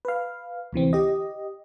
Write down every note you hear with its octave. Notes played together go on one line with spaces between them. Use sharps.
B4 F5
D2 C3 E3 C4
G4 D#5